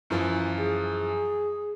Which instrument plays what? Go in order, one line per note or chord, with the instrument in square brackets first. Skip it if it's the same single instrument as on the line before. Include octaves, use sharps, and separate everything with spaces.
[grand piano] F#2 E3 F3
[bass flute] G#4